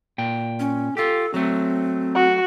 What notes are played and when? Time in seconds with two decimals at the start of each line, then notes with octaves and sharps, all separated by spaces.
0.18 A#2 G5
0.60 C#4
0.97 F4 G4 A4
1.34 F#3 A3 C4
2.15 F#4